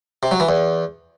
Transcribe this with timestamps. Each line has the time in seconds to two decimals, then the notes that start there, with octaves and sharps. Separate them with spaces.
0.23 C3
0.31 F#3
0.40 E3
0.49 E2